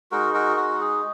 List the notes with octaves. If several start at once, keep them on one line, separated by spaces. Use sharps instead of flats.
G#3 D#4 F#4 A#4
F#4 A#4
F#4
G#4